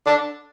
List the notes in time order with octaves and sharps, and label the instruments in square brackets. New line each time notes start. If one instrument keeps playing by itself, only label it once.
[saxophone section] D4